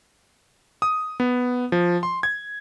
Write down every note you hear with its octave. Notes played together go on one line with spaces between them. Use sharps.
D#6
B3
F3
C6
G#6